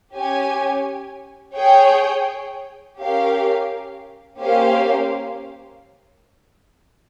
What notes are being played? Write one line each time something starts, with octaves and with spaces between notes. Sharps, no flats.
C#4 G4 C#5 G#5
G#4 C#5 G5
C#4 G4 A#4 F5
A#3 C#4 G4 C5 F5